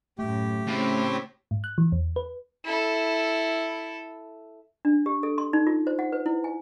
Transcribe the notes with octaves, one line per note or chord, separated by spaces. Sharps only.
F#2 A2 A3 G4
A2 C#3 C4
G#2
F#6
E3
E2
B4
E4 A4
D4
G4
A4
C6
D#4
F4
C5
F#5
B4
E4
G#5